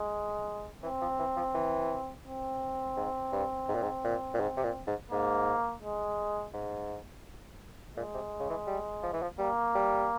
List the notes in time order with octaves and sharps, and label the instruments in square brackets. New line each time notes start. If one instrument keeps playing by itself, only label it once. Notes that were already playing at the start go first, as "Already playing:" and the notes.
Already playing: [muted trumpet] G#3
[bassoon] E3 [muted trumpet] C4
[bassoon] F3
E3
F3
E3
[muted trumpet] C4
[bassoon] G#2
G2
G#2
A#2
G#2
A#2
A#2
G#2
C3
A#2
G#2
[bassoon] G#2 [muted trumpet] A#3
[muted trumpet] G#3
[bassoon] G#2
[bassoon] A#2 [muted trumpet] G#3
[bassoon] C3
C#3
E3
G3
F3
E3
F3
[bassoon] G3 [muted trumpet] A#3
[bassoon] G3